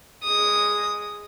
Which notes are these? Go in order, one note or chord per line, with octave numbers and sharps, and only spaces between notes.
G#3 D#6